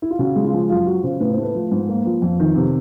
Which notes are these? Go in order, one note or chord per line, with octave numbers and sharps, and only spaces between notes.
E4
F4
C#3 F#4
G#3
F4
F3
F#2 F4
F3 F#4
C#3 C5
A2 B4
C5
A3
B4
F3
G#2
A#3
F3
F2
D#3
C3